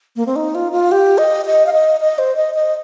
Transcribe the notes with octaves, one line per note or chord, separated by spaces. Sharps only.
A#3
C4
D#4
F4
F4
G4
D#5
D#5
F5
D#5
D#5
C5
D#5
D#5